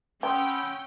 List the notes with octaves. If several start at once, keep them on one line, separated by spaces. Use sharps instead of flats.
C#4 G4 F#5 G5 B5 C6 D#6 E6